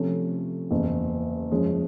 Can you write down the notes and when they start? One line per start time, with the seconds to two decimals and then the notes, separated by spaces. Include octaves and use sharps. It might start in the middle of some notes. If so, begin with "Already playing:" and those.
Already playing: C3 F3 A3 C#4
0.71 F#1 E2 C#3
1.51 F#2 C#3 F3 G#3 C#4